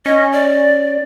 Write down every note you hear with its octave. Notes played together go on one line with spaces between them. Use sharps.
C#4 D#5
D5